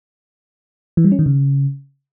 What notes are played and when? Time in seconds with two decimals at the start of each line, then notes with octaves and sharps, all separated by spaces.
0.97 E3
1.04 G3
1.12 C#4
1.19 D#3
1.26 C#3